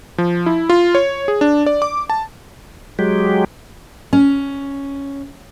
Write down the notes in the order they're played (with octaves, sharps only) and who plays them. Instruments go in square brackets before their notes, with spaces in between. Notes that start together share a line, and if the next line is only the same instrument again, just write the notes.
[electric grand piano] F3
E4
F4
C#5
G#4
D4
D5
D6
A5
[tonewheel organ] F#3 G#3 G4
[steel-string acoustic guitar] C#4